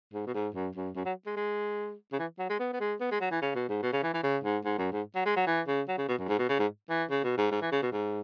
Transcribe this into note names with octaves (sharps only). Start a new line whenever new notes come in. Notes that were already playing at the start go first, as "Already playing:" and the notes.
G#2
B2
G#2
F#2
F#2
F#2
F#3
G#3
G#3
C#3
E3
F#3
G#3
B3
B3
G#3
B3
G#3
F#3
E3
C#3
B2
G#2
B2
C#3
E3
E3
C#3
G#2
G#2
F#2
G#2
F#3
G#3
F#3
E3
C#3
F#3
C#3
B2
F#2
G#2
B2
C#3
G#2
E3
C#3
B2
G#2
G#2
E3
C#3
B2
G#2